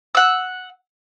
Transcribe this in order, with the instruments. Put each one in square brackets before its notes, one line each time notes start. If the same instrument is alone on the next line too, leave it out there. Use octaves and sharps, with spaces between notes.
[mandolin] F#5 E6